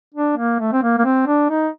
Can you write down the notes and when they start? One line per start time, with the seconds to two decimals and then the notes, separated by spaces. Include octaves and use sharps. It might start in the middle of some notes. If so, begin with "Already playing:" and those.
0.14 D4
0.37 A#3
0.60 A3
0.73 C4
0.83 A#3
0.98 A#3
1.05 C4
1.27 D4
1.50 D#4